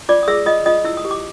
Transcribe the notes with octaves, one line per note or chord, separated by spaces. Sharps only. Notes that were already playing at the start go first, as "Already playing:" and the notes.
F4 D5 D6
D#6
G#4 E5 E6
F4 D#5 D#6
F4 D#5 D#6
E4 E6
D#6
G4
D6